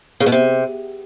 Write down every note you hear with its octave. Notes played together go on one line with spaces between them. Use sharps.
C#3
B2
C3